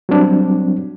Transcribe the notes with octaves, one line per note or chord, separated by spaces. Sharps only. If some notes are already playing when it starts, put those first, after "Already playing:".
F#3 G3 C4 D4